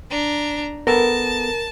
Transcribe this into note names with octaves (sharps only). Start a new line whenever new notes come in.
D4 A#5
B3 A4 A#4 A5